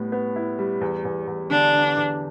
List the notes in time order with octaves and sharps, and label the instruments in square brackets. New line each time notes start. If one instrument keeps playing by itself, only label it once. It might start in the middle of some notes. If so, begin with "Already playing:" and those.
Already playing: [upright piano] A2 G3 B3
B3
E4
G3
E2
E2
E2
[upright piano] D3 [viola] D4
[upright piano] D3
E2